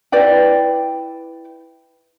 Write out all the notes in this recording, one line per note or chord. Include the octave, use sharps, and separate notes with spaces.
E4 B4 D5 G5